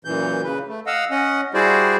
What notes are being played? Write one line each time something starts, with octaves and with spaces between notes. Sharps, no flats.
F#2 A#2 E3 G6
C#3 B4
A3
D#5 F5 F#5 E6
C#4 D#5 F#5
G3 E4 F#4 G#4 C5 D5